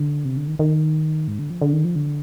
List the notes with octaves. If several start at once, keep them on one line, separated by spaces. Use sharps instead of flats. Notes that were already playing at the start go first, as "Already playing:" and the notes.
Already playing: D3
C3
D3
D#3
D#3
G#2
D3
F3
D3
D#3
F3
D3